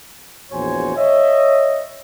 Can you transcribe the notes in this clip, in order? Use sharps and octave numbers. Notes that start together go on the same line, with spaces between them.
A#1 E2 F#4 C5 C#5 G#5
C#5 D#5 E5